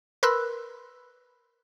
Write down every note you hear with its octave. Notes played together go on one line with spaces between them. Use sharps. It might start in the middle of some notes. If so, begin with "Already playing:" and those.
A#4 B4 B5 C6 E6 F#6